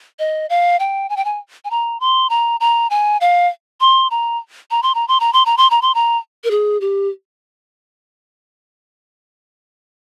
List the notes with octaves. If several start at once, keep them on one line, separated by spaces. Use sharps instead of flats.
D#5
F5
G5
G#5
G5
G#5
G#5
A#5
C6
A#5
A#5
G#5
F5
C6
A#5
A#5
C6
A#5
C6
A#5
C6
A#5
C6
A#5
C6
A#5
A#4
G#4
G4